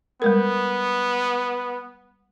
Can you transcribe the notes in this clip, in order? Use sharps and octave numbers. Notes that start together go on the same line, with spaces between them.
G3 G#3 B3 A#4